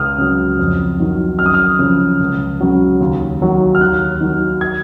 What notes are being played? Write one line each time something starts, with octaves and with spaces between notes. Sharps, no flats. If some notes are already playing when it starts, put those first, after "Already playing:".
Already playing: C#2 D#6 F6
C#3 F#3
F2
D#3 F#3
F#2 F6
D#6
F6
C#3 F3
C#2
C#3 F#3
D#2
D#3 F#3
F6
D#2 F#6
D#3 F#3
G#6